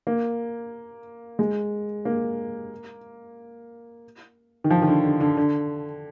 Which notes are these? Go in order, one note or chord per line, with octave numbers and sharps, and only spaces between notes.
A#3
G#3
A#3
D#3
F3
D#3
D3
D3
D3
D3